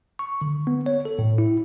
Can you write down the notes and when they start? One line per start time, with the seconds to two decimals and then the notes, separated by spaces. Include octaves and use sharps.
0.19 C#6
0.42 D3
0.67 B3
0.86 C#5
1.05 A4
1.19 A2
1.38 E4